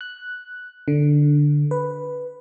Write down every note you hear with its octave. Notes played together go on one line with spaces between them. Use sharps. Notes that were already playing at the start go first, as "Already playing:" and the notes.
F#6
D3
B4